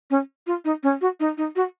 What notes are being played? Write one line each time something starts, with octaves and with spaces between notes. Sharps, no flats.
C#4
F4
D#4
C#4
F#4
D#4
D#4
F#4